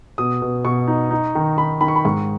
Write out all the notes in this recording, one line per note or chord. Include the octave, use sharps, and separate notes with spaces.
B2 D#6
B2
B2 C#6
D#4
D#4
D#3
D#3 B5
D#3 B5
C#6
B5
G#2 C#6